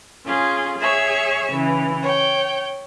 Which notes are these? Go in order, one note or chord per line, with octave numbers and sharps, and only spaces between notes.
C#4 F4 G#4
G#4 C#5 E5 C#6
C#3 E3
C#5 G5